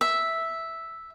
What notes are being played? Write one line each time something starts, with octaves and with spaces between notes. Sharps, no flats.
E5